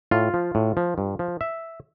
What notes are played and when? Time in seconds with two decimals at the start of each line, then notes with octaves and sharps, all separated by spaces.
0.11 A2 F4
0.34 F3
0.55 A2
0.77 F3
0.98 G2
1.19 F3
1.41 E5